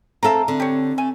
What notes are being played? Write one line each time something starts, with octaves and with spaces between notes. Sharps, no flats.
C4 A4 E5 F5 A#5
D3 C4
G4 C#5
A3 G#5